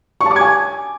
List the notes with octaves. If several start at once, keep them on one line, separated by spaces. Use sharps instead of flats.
C#6
A5
D6
G#6
G#5